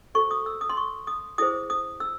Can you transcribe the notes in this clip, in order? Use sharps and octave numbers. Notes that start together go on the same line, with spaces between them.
F#4 A4 C5 C#6
D#6
E6
D#6
C6
C#6
D#6
E4 G#4 C5 D#6
D#6
E6